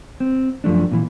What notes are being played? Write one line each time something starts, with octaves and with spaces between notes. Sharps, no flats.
C4
F#2 F3 A3 D4
A#2 E3